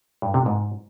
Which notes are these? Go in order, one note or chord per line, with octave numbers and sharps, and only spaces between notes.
G2
C3
G#2